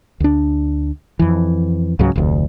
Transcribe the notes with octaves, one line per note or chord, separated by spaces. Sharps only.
D2 D4
F2 E3
C#2 G#2 C#3 F#3
F1 D2